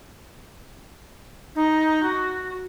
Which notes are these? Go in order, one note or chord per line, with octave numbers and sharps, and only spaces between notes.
D#4
F#4